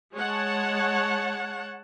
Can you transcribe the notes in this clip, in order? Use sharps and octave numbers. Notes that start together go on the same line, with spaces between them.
G#3 C#5 F#5 A5